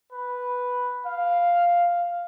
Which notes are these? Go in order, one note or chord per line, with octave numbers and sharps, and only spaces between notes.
B4
F5